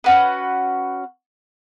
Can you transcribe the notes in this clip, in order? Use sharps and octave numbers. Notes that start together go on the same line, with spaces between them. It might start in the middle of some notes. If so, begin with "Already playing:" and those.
C#4 F#4 B4